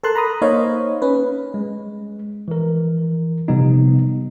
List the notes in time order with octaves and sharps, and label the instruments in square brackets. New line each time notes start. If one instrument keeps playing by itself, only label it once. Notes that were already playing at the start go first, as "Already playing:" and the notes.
[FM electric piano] A4 A#4 A5 C6 F#6
A#5 B5 D#6
A#3 D#4 C5 C#5 D#5 F5
C#4 B4
[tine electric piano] G#3
E3 A#4
C3 F3 G3 B3 D#4